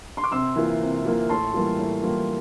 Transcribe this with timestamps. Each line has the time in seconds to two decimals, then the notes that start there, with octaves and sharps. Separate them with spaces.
0.17 C6
0.24 D6
0.31 C3 C6 E6
0.56 E3 A#3 F4
0.81 C3
1.05 E3 A#3 F4
1.29 A2 A5 C6
1.54 E3 G3 A#3 F4
1.79 A2
2.03 E3 G3 A#3 F4